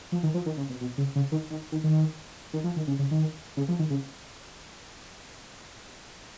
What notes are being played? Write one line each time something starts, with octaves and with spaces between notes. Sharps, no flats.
F3
D#3
F3
D#3
C#3
B2
B2
C#3
C#3
D#3
D#3
D#3
D#3
D#3
F3
D#3
C#3
C#3
D#3
C#3
F3
D#3
C#3